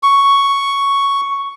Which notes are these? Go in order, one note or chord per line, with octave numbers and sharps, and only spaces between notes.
C#6